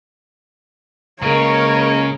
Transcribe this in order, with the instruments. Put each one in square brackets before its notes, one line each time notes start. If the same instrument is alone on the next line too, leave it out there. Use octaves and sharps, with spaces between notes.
[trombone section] C#2 G#3 A#3 [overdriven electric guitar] C#3 [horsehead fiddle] A#4 C#5